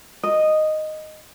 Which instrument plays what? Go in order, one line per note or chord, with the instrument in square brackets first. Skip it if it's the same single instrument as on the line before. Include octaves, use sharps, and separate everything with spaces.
[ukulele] D#5